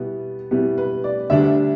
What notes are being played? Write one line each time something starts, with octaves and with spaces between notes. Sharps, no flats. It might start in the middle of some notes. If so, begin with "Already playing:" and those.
Already playing: B2 G3 B3 E4
B2 G3 B3 E4
B4
D5
D2 D3 G3 D4 E5